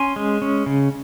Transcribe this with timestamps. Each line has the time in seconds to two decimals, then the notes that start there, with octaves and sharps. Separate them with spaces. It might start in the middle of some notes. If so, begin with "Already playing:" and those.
Already playing: C#4 G#5 C6
0.16 G#3
0.42 C#4
0.66 C#3